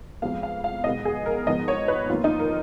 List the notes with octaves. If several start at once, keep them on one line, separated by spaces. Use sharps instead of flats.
F2 F3 G#3 B3 F5
F5
F5
B2 G#3 B3 D#5
G#4
A#4
G#2 F3 B3 D#5
C#5
B4
F2 D#3 A#3 F4
D#4
A#4